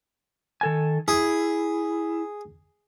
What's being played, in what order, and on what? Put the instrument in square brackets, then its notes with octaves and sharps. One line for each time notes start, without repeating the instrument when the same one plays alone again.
[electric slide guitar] D#3 A4 G#5
[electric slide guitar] E4 [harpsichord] G#4